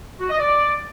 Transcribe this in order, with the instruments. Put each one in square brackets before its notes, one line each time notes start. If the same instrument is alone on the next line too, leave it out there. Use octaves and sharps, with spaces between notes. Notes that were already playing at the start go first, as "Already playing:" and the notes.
[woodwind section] F#4
D#5
D5